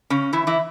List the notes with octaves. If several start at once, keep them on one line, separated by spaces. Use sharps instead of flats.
C#3 C#4
E3 E4
E3 E4